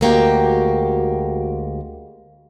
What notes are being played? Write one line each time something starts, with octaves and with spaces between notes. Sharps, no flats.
D2 G#3 A#3 F#4 G4 G5